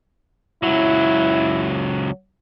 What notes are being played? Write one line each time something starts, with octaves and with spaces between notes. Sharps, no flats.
C#2 F#3 E4